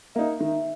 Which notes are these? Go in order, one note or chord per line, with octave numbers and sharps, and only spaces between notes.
A#3 D#4 E5
D#3 E5